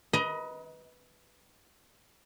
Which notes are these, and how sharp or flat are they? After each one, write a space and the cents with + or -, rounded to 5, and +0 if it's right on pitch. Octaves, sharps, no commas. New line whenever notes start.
B4 +0 D#5 +20 A#5 +35